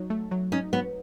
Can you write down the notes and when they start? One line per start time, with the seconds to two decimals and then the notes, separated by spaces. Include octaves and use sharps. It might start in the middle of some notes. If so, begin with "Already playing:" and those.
Already playing: F#3 D#4
0.10 A3
0.31 F#3
0.52 C#4 D#4
0.73 F#3 B3